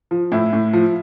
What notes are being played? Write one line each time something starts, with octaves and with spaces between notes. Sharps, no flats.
F3
A2 E4
A2
F3